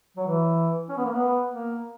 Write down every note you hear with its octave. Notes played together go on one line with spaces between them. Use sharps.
F#3
E3
C#4
B3
A#3
B3
A#3